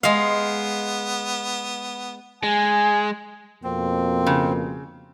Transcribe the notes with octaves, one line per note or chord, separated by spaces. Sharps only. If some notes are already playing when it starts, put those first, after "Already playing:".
G#3 B3 F5
G#3 G#5
F2 B2 A#3 C4
C#3